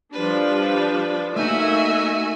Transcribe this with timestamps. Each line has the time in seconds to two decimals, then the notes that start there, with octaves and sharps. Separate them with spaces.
0.13 F3 G3 D4 B4
1.36 A3 A#3 D#4 F#4 E5 G#5